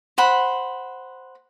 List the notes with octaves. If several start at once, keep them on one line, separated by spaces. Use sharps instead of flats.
C5 F#5 B5